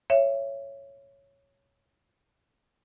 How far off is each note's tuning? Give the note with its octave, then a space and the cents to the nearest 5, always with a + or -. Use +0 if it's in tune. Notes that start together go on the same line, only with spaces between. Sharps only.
C#5 +0 E5 +25